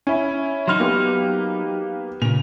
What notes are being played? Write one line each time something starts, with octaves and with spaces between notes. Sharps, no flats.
C#4 E4
F#3 D#4 B5 C6 F6
A#3 B3 G4
A#2 C#3 F7